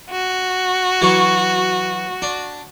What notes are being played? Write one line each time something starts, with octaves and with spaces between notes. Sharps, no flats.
F#4
E3 F#3 C#6
D4